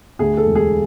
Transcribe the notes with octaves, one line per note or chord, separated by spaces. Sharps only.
D2 G#4
A4
E1
G#4